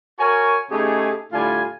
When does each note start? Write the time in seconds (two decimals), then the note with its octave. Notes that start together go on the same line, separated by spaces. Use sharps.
0.19 F#4 A#4 C#5 G#5
0.71 C#3 A3 D#4 G4 G#4
1.33 A2 D3 G3 F4 G#5